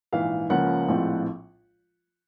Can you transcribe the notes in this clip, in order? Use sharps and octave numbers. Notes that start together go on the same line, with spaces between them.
A#1 G#2 E3 F5
C#2 C#3 F3 A#3 C#4 F#5
A#1 A2 F3 G#3 C4